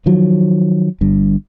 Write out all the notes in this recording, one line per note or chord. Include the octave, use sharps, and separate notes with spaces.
D#3 F3 F#3
G1 G2